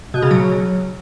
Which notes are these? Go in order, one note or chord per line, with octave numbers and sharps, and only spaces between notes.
B2
C#3
F#3